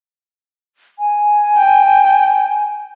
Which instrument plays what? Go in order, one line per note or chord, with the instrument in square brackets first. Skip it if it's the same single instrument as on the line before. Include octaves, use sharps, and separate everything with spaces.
[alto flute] G#5
[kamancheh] G5